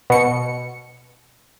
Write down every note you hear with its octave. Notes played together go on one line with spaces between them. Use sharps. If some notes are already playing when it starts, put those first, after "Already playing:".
B2 C#7